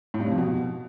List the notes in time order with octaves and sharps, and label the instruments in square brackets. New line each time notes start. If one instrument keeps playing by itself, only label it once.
[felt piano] A2
G2
C3
F2
B2